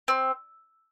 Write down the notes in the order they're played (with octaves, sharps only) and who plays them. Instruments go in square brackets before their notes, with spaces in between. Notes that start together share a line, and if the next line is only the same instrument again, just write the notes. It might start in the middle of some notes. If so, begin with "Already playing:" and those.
[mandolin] C4